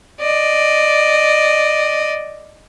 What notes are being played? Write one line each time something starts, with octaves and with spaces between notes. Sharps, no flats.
D5 D#5